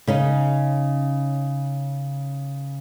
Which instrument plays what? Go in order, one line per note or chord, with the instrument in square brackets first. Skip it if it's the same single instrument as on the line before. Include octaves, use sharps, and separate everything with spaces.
[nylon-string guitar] C#3 C#4 D#4